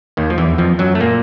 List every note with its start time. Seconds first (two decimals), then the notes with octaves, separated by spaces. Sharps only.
0.17 D#2 D#3
0.30 F3
0.38 E2 E3
0.58 F2 F3
0.79 F#2 F#3
0.95 A3
1.00 A#2 A#3